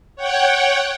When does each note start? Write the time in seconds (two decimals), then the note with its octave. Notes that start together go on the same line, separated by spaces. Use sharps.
0.16 C#5 F#5 G5